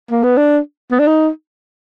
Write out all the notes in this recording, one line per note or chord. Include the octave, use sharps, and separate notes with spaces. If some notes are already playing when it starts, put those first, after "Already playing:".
A#3
B3
D4
B3
D4
D#4